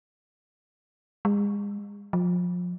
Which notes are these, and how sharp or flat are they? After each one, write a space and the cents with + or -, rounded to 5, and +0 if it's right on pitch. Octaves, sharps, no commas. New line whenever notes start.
G#3 -35
F3 +30